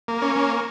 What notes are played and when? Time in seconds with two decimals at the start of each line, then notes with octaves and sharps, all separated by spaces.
0.08 A#3
0.22 C#4
0.36 A#3